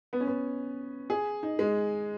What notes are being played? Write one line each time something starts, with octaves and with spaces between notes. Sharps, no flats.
B3
C#4
B3
G#4
D#4
G#3